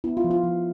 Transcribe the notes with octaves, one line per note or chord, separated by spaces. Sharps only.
B3 E4
F4
F3
F4
F3